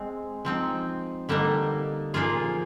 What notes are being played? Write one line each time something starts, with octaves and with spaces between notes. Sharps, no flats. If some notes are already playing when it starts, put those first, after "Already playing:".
Already playing: G#3 C4
F3 C4 D#4
D3 G3 A#3 D#4
A#2 F3 A#3 F4 G#4